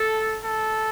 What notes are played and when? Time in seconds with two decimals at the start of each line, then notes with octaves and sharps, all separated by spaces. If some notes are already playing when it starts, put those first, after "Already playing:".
Already playing: A4
0.43 A4